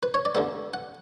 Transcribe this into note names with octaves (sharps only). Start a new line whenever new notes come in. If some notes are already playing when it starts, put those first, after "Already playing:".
B4
C#5
D5
D2 D3 G#3 B3 E5
F#5